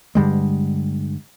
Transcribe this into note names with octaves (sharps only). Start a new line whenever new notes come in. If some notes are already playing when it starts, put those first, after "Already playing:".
G2 D3 G3 G#3